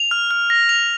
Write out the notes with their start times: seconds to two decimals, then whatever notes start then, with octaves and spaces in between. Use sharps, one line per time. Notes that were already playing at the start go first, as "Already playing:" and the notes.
Already playing: F7
0.11 F6
0.31 F6
0.50 A#6
0.69 F7